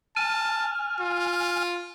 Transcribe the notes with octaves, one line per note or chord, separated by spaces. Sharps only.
G#5 A5 F6
F4